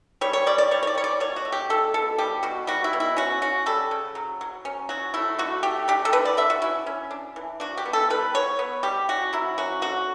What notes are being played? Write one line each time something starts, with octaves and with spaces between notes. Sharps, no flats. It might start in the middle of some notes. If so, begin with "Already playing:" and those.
G3 C#5
C#5
G3 D5
D5
G3 C#5
C#5
D5
G3 C#5
D5
B2 C#5
F#4
A3
G4
B2 A4
B2 A4
G3 G4
B2 F#4
G3 F#4
E4
B2
E4
C#4 F#4
C#4 F#4
G3 A4
C#3
F#3
F#3
C#4
F#3 F#4
A3 E4
D3 F#4
A3 G4
D4 G4
A4
D3 B4
D5
D3 E5
F#4
C#4 E4
C#4
D4
E3
D4 F#4
G4
B3
A4
G3 B4
B3 C#5
B3
G3 G4
C#4 F#4
F#3 E4
C#4 F#4
D3 F#4